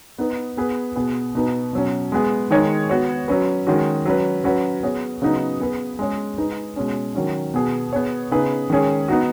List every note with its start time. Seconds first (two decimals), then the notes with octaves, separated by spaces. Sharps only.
0.18 B3 D#4 B4
0.57 B3 G#4 B4
0.96 B2 B3 G#4 B4
1.35 B2 B3 D#4 B4
1.73 B2 F#3 C#4
2.12 G#3 B3 G#4
2.50 D#3 G#3 D#4 G#4 C#5
2.89 B3 F#4 C#5
3.28 F#3 C#4 B4
3.67 D#3 G#3 C#4 F#4
4.05 F#3 C#4 B4
4.44 F#3 C#4 F#4 B4
4.83 B3 G#4 C#5
5.22 C#3 F#3 B3 D#4 B4
5.60 B3 G#4 B4
5.99 G#3 C#4 G#4 C#5
6.38 G#3 D#4 B4
6.76 B2 G#3 C#4
7.15 D#3 F#3 C#4
7.54 B2 B3 G#4
7.93 B3 G#4 C#5
8.31 C#3 B3 D#4 G#4 B4
8.70 D#3 G#3 C#4 G#4
9.08 B3 D#4 F#4